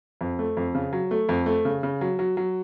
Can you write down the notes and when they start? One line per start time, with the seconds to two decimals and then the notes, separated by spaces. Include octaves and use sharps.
0.21 F2
0.39 A3
0.57 F2
0.75 C#3
0.93 F#3
1.11 A3
1.29 F2
1.46 A3
1.65 C#3
1.83 C#3
2.01 F#3
2.19 F#3
2.37 F#3